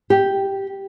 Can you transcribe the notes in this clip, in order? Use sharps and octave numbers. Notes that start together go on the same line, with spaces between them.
G4